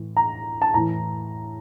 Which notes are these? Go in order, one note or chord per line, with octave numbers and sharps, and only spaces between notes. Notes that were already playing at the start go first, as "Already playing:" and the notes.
Already playing: A2 E3
A#5
A5
A2 E3 A#5